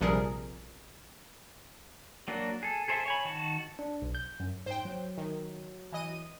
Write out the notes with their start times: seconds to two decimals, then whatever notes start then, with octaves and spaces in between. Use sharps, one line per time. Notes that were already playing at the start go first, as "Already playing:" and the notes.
0.01 A#1 C3 F3 G3 G#4 A#4
2.28 F#3 A#3 D4 F#4
2.63 G#4 A4
2.88 G#4 A4 C5 D5 E5
3.06 C#5 G#5 B5
3.25 D#3 F#4 A5
3.79 D4
4.02 B1
4.15 G6
4.40 F#2
4.66 G#2 C5 G5
4.85 F#3
5.18 D#3
5.92 E3 D#5 D#7